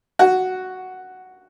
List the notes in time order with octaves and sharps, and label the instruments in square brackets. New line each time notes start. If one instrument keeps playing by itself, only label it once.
[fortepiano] F#4